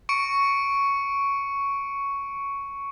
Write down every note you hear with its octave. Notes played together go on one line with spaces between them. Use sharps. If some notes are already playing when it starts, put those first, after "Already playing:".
C#6 C#7 D7